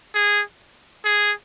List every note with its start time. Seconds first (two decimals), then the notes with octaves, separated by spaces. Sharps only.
0.15 G#4
1.05 G#4